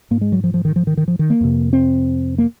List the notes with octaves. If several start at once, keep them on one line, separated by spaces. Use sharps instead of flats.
G#2 A#3
G#3
F#3
F3
F3
D#3
F3
D#3
D#3
F3
D#3
A#3
F2 C3
C4
A#3